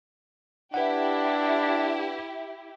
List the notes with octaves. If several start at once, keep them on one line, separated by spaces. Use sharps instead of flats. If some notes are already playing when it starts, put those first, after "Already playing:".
D4 E4 G4 B4 F#5